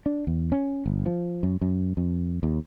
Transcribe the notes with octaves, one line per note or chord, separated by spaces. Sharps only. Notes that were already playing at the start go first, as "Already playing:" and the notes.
D4
E2
C#4
G1
F3
F#2
F#2
F2
D#2